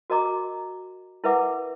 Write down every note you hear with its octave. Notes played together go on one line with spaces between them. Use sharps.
F#4 A#4 D#5 A#5 D6
E4 A#4 B4 E5 F#5 D6